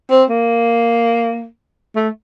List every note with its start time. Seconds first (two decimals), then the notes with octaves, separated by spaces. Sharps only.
0.11 C4
0.29 A#3
1.95 A3